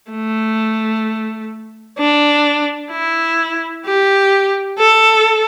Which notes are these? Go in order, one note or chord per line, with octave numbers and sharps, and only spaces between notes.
A3
D4
E4
G4
A4